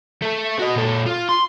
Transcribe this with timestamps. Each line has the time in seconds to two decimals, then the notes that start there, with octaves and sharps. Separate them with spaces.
0.22 A3 A4
0.59 F#4 D#5
0.75 A#2 A4
1.06 F4
1.29 C6